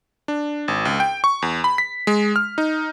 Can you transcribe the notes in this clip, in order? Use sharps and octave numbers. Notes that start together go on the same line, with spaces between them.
D4
G#1
C#2
G5
C#6
E2
B5
B6
G#3
F6
D#4